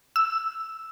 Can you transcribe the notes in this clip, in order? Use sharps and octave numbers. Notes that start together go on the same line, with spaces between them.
E6